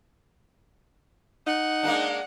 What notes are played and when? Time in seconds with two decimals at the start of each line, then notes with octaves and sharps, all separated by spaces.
1.47 D#4 F#5
1.83 G#3 A#3 D4